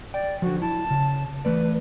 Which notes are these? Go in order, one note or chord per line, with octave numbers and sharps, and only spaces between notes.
D5 G5
D3 F3 F#4
E4 A5
C#3
E3 A3 B4 D5